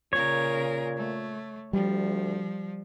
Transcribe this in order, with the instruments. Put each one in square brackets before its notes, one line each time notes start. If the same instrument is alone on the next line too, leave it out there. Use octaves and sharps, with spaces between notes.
[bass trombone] A#2 [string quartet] C#3 A#4 [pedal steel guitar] C#5
[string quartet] A3
[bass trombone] D2 [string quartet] F3 [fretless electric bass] G3